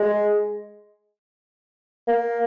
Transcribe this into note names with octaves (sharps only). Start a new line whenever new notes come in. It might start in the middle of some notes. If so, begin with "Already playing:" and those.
Already playing: G#3
A#3